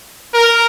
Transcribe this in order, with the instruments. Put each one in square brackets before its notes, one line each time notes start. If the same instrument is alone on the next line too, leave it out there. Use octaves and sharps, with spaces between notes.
[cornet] A#4